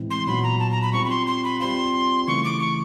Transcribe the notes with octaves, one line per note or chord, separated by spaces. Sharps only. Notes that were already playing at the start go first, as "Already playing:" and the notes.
Already playing: A2 E3 G#3 C4 E4
C6
A#2 F#3 B3 D#4 F#4 B5
A#5
A5
A#5
B5
G3 C4 F4 C#6
B5
C6
C6
B5
G3 C4 F4 C6
C#3 E3 A3 C#6
D6
C#6